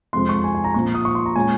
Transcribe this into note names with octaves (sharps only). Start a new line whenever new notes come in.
F2 C3 F3 G#3 C4 C6
C#6
G#5
G#5
A#5
A#1 A#2 F3 C#6
D#6
C#6
C6
A#5
A#2 G#3 C#4 G#5